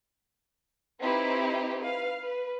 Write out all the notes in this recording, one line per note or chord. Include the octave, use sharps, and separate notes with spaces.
C4 D#4 E4 G4 B4
B4 F5
B4